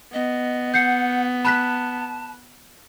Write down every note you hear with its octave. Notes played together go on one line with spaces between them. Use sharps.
B3 D#5
F#5 G6 C7 C#7
A5 B5 F#6 B6